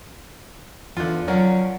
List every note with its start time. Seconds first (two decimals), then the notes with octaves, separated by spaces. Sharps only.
0.97 E2 D3 F4
1.28 F3 F#3 C#4 A#4 D5 F#5